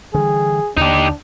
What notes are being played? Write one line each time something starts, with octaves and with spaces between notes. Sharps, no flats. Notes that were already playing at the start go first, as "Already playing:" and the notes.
D3 E3 G3 G#4
D#2 D3 D4 D#4 G4